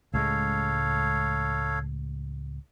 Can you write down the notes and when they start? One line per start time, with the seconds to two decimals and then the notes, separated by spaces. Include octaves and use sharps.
0.14 C#2 A2 G#3 A4 C#5 F5